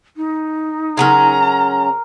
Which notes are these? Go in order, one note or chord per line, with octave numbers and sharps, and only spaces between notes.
D#4
C#3 F#3 C#4 A#4 A#5 C6